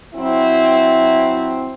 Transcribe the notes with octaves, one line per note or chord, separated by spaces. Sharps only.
F#3 C4 E4